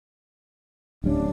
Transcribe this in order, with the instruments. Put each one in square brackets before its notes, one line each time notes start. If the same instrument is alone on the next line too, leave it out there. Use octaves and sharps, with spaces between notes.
[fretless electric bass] D1 G3 C#4 [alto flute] D4